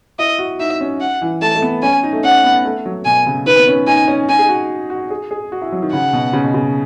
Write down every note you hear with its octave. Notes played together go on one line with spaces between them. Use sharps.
E4 D#5
F#4
D#4 E5
C#4
F#5
E3
A3 A5
A3
B3
C#4 G#5
D#4
A3
C#4 F#5
B3
A3
F#3
B2 G#5
C#3
D#3 B4
B3
C#4
D#4 G#5
C#4
D#4 G#5
G#4
F#4
F#4
G#4
G#4
F#4
E4
F#3
D#3
C#3 F#5
B2
C#3
B2
C#3